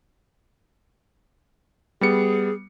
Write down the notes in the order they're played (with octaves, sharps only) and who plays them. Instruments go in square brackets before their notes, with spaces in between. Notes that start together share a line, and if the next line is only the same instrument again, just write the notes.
[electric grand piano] G3 B3 C#7 [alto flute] G#4